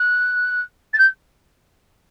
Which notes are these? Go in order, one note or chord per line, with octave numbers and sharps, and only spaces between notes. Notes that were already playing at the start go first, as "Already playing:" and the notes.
Already playing: F#6
A6
G6